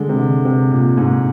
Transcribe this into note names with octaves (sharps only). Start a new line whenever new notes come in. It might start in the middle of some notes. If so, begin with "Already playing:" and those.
Already playing: D3 G#3
C3
D3
C3
A#2
G#2